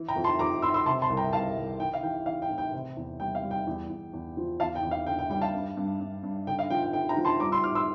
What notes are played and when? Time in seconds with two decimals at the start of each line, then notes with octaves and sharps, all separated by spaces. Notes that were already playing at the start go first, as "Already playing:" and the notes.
Already playing: E3
0.08 G5 A#5
0.16 F2
0.24 A5 C6
0.39 F2 A#5 D6
0.62 E3 C6 E6
0.74 C6 E6
0.86 C3 A5 C6
1.02 A5 C6
1.10 C2
1.17 G5 A#5
1.33 C2 F5 A5
1.57 C2
1.80 E3 G5
1.94 F5
2.02 E3 G5
2.26 E3 F5
2.42 G5
2.50 A2
2.58 G5
2.73 C3
2.97 E2
3.20 G3 G5
3.35 F5
3.43 G3
3.51 G5
3.67 E2
3.90 E2
4.13 E2
4.37 F3
4.60 E2 F5 A5
4.75 G5
4.83 E2
4.91 F5
5.07 D3 G5
5.19 G5
5.30 G3 G5
5.41 F5 A5
5.54 G2
5.77 G2
6.00 G2
6.23 G2
6.47 D3 G5
6.59 F5
6.70 F3 G5
6.83 G5
6.93 D3 G5
7.09 G5 A#5
7.17 F3
7.25 A5 C6
7.40 G3 A#5 D6
7.52 C6 E6
7.64 A2 D6 F6
7.75 C6 E6